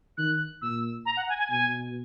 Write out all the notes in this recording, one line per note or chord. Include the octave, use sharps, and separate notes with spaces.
D#3 F#6
A#2 E6
A#5
F#5
G#5
G#5
B2 G#5